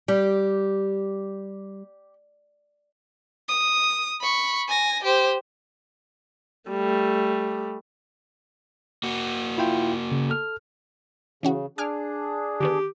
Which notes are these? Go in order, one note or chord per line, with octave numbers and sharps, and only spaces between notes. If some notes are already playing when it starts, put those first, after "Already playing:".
G3 G4
D#6
B5 C#6
G#5 A#6
G4 C5
G3 A3
A#3 F#4
E4 F4 G5
C#3
A4 F6
C#3 E3 C#4 F#4
D4 G#4 G#5 D6 F6
D3 D#3 B3 G4